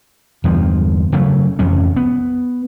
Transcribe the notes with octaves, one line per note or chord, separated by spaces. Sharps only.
E2 G2 D3 F3
C#3 F#3 A3
A1 F2 C3 C#4
B3